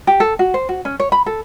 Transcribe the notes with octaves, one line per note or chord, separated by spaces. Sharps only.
G4
A4
F#4
C5
F#4
C#4
C#5
B5
A4